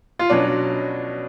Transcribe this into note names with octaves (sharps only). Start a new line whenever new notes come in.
F4
B2 F#3 C#4 D4